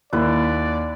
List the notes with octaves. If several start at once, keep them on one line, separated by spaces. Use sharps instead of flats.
D#2 E4 B4 D5